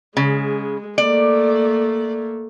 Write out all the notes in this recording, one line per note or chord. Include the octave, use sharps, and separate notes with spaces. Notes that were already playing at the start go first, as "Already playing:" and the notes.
C#3 G#3
A3 A#3 D5